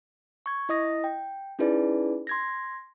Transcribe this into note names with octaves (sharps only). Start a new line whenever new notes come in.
C#6 G#6
E4 D#5 D#6 A#6
G5
C#4 D#4 E4 G#4 B4 D5
C6 G#6 A#6